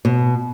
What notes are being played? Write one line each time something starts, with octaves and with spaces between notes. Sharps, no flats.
B2